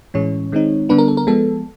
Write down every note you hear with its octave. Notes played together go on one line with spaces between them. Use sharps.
A2 E3 G#3 C#4 C#5
D#3 G#3 C4 D#4
D3 G3 B3 D4 B4
A#4
A4
A#4
F3 G#3 B3 A4